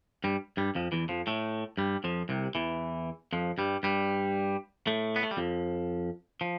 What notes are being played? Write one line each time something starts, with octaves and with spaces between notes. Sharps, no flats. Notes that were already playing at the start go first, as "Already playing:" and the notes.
G2 G3
G2 G3
F2 F3
E2 E3
F2 F3
A2 A3
G2 G3
F2 F3
C2 C3
E2 E3
F2 F3
G2 G3
G2 G3
A2 A3
B3
A3
G3
F2 F3
F3